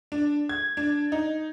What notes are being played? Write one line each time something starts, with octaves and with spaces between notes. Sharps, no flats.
D4
G#6
D4
D#4